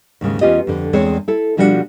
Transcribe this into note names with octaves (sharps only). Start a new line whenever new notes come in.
D#2 G#2 C#3 G#3
E2 B3 C#4 F4 G4 D#5
F2 D3
E2 G#3 C4 D4 G#4 C#5
E4 A4
B2 F3 G3 D4 E4 F#4